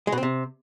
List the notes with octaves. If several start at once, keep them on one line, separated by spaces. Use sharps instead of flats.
G#3
B2
C4
C3